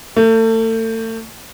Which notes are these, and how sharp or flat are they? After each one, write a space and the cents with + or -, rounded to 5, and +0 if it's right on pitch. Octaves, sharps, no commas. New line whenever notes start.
A3 +35